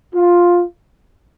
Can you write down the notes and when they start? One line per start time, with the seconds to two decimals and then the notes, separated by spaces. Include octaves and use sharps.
0.14 F4